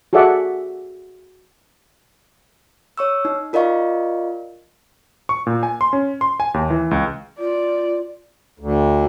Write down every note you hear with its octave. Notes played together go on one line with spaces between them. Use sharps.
F#4 G#4 A4 D5 E5 F#5
C#5 C#6 E6
D#4
F4 A#4 D5 D#5 F5 C#6
C#6
A#2
G#5
C6
C#4
C6
G#5
D#2
E3
C#2
F4 D5
D2